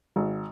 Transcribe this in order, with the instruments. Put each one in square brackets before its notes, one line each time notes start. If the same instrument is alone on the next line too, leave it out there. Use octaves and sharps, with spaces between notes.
[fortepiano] G#1